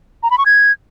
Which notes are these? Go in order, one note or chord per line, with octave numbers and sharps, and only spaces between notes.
A#5
B5
C#6
G#6